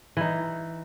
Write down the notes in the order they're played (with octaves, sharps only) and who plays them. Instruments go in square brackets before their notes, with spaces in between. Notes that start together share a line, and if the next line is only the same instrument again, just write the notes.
[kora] E3 D#4